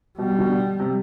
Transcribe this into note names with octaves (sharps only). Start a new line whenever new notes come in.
B2 G3
B2 D3
C3